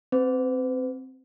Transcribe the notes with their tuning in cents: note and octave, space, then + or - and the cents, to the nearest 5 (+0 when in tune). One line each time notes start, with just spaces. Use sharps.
C4 +0 B4 +45